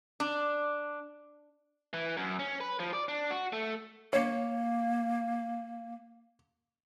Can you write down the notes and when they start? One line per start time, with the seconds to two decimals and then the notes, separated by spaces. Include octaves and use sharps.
0.20 D4
1.93 E3
2.17 F#2
2.39 C#4
2.60 B4
2.80 F3
2.93 D5
3.08 D4
3.30 F#4
3.53 A3
4.13 A#3 C#5